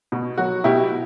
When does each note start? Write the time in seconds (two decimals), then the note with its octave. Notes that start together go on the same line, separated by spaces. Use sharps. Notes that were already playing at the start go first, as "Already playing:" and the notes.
0.12 B2
0.38 F#3 F#4
0.64 B2 E4 G4